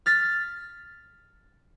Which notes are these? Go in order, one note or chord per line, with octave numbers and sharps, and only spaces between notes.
F6 A6 B6